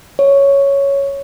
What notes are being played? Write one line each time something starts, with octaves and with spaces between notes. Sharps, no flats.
C#5